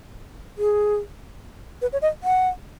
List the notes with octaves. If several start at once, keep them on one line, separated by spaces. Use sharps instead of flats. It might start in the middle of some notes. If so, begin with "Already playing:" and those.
G#4
B4
C#5
D#5
F#5